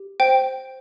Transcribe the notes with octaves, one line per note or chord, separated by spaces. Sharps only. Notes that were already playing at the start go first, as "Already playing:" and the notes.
Already playing: G4
C5 G5